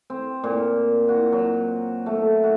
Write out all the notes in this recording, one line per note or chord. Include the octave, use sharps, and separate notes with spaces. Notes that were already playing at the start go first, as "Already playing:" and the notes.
C4
A#2
F#4
F#3
A3
F#4